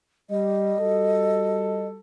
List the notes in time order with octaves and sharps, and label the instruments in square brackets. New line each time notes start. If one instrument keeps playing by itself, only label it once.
[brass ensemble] G3 [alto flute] D#5
[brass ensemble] G3 F#4 A4